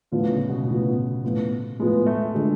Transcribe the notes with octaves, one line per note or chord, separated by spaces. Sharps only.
A2 D3 F3 B3 F4
C#3
B2
A2 F3 B3 F4
A2 F3 B3 F4
A2 F3 G#3 B3 F4
A3
D3 G#3